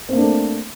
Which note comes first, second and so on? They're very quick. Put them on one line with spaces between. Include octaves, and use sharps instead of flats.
C4 A#3 D4 A3